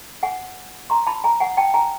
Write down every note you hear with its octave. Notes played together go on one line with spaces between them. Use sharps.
F#5 G#5
A#5 C6
A5 B5
G#5 A#5
F#5 G#5
G5 A5
G#5 A#5